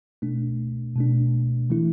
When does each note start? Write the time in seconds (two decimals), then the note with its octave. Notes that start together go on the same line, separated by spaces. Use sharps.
0.22 B2 A3 D4
0.96 B2 A3 D4
1.70 E3 A3 E4